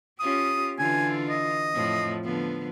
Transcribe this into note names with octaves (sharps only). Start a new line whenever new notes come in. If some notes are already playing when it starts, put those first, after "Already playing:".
C#4 F4 G4 D#6
D3 E3 F4 G#5
D#5
F2 A2 F3
D3 F3 B3